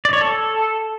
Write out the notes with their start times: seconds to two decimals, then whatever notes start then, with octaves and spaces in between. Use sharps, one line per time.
0.05 D5
0.13 C#5
0.21 A4